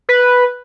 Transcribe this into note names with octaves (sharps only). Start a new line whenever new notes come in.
B4